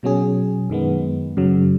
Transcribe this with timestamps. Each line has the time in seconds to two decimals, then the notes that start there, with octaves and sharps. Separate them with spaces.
0.03 B2 F#3 C#4 G#4
0.70 F#2 D#3 G#3 B3
1.37 F#2 C#3 F#3